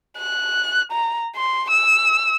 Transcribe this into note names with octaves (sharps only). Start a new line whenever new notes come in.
F#6
A#5
C6
E6